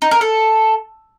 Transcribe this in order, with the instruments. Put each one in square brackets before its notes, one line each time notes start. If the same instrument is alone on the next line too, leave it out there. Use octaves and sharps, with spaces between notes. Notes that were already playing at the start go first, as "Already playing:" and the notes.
[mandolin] D#4
A#4
A4